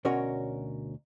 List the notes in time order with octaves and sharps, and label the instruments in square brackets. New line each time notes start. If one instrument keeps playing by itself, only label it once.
[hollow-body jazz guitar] D2 B2 C#4 F#4 A#4 C#5